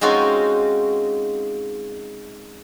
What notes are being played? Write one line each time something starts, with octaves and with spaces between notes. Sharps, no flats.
G#3 C4 C#4 D#4 F4 F#4